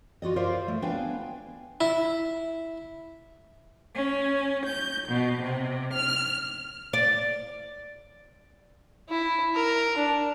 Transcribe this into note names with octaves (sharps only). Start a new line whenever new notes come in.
F4 F#4 D5 D#5
F4 A#4 C5 D5 E5 F5
A3
B3 D4 B4 F5 G5 G#5
E4
C#4
G6
B2
C3
F6
D5
E4
A#4
D4